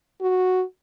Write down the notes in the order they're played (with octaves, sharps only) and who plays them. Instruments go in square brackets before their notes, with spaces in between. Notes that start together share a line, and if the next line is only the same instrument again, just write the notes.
[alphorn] F#4